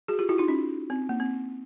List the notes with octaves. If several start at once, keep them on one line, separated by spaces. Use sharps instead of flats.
F#4 G#4
F4 G4
E4 F#4
D#4 F4
C#4
C4
A#3
C4